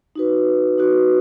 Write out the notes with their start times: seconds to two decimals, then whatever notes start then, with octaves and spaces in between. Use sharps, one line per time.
0.15 D#4 F#4 B4
0.78 D#4 F#4 B4